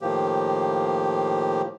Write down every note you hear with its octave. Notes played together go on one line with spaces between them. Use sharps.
A2 D#3 F3 A#3 G4